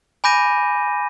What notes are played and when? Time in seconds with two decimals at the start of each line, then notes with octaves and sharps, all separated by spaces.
0.24 G#5 B5 D6 G6 A#6 D#7